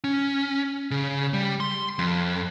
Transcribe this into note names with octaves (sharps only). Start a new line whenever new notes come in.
C#4
C#3
G3
C6
F2